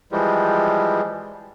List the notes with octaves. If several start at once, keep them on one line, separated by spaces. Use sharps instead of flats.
E3 F3 G3 G#3